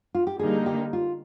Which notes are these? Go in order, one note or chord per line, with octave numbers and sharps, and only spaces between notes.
F4
G4
D3 G3 A#3 D#4 G#4
G4
F4